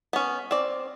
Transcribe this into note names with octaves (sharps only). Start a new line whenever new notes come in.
B3 C#4
C4 D5